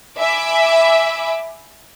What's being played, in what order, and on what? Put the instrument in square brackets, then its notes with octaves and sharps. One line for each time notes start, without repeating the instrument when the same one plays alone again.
[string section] E5 G#5 B5 D6